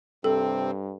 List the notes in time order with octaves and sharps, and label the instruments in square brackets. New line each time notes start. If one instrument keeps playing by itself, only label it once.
[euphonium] G2 [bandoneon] C3 C4 [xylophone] A4